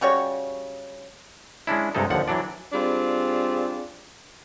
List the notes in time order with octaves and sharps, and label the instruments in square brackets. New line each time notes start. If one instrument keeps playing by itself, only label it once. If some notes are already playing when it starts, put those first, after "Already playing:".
[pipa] C#3 G3 F#4 C#5
[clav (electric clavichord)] G#3 C#4 D4 E4
G2 C3 G#3 D#4 A4
D#2 D3 F3 F#5
E3 F#3 D4 D5
[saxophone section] G3 C4 D4 F4 G#4